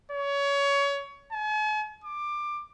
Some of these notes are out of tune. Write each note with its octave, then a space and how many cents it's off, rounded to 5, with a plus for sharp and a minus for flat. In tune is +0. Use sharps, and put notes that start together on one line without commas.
C#5 +25
G#5 +45
D6 +20